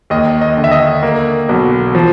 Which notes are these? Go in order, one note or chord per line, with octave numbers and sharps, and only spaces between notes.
D#2 D#5
D#5
D3
E5
D#5
A#3
B1
F3